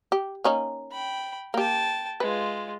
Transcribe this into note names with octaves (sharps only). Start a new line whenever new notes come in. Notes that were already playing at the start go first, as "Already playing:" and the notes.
G4
A#3 C#4 D#4
G5 B5
A#3 G4 G5 A5
G#3 F4 B4